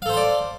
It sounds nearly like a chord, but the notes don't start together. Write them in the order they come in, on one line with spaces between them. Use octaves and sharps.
F5 A4 C5 C6 D5